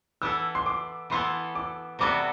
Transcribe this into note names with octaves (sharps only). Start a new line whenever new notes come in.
E3 B3 E4 A4 E6
C6
D6
E3 B3 E4 A4 C6
D6
C3 G3 B3 F#4 A4 D6